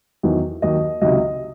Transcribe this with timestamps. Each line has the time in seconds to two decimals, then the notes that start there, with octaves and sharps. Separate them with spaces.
0.23 E2 D#3 F#3
0.62 D#2 D#3 F#3 D#5
1.01 C#2 C3 D#3 F#3 D#5